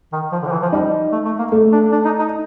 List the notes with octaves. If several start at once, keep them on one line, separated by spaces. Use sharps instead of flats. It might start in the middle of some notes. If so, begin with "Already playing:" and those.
D#3
F3
D3
F3
E3
F3
G3 D#4
A3
A3
A#3
A3
D4
D4
D#4
D#4